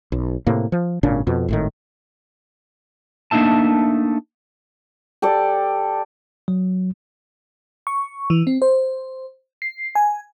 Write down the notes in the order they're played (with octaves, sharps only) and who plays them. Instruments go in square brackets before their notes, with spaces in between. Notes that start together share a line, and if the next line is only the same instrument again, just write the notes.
[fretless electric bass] B1
A2 C3 A#3
F3
G#1 A#2 C#3 D4
F2 B2
G#1 A2 D#3
[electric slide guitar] A3 A#3 D4 D#4 E5 A5
[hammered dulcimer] G4 A4 D5
[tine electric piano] F#3
[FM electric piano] C#6
E3
C4
C5
C7
G#5